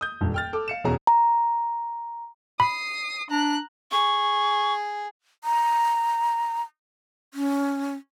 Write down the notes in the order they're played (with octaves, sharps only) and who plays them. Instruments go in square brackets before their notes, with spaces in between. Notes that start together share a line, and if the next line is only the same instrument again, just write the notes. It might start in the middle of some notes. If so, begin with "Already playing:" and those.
[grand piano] D#6 G6
D#1 G2
G5 F6 A6
A4 D6
F5 C#7 E7
E1 B2 C#4 G#4 A#5
[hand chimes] A#5
[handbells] B5 [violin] D#6 C7
[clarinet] D4 [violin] A#5 F#6
[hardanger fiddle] G#4 [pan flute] C#6
[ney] A#5
C#4